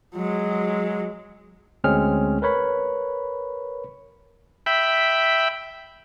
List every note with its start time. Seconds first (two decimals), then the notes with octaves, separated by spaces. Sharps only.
0.15 F#3 G#3
1.84 D2 G#3 C4 C#4 G#4 F6
2.42 A#4 B4 C#5 B5
4.66 E5 G5 B5